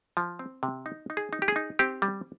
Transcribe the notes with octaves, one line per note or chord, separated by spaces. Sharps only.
F3
C4
C3
D#4
D#4
G#4
D#4
G4
G#4
D#4
C4 G4
G3